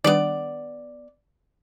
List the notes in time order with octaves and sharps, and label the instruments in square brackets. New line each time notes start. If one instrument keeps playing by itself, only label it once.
[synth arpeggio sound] D#3 G3 D4 [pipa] B3 D5